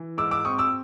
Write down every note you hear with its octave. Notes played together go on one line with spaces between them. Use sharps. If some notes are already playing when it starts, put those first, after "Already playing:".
Already playing: E3
G#2 D6 E6
D6 E6
C4 C#6 D#6
D6 E6